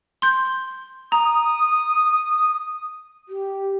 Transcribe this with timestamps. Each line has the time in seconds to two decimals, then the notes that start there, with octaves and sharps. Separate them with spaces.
0.22 C6 G6
1.12 A#5 D#6
3.29 G4